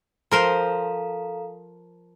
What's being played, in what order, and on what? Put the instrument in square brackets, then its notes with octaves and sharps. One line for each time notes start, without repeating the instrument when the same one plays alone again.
[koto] F3 A#4 C5 [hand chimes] A4 F5 A#5